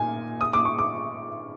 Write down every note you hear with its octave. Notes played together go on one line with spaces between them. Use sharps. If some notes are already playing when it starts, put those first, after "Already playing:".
Already playing: A#2 A#3 D#4 G#5
D#6
D6
C#6
D6